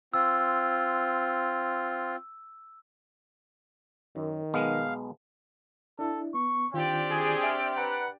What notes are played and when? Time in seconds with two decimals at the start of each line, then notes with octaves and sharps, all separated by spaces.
0.14 C4 F4 E6
4.16 F#2 D#3
4.54 B1 G#3 B3 F5
5.99 D4 E4 A4
6.34 B3 C#6
6.74 D#3 C4 D4 F4 G4 D5
7.10 G#4
7.43 E5 F6
7.77 B4 F#5 A#5